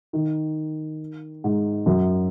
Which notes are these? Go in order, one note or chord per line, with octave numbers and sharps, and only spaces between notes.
D#3
G#2
F#2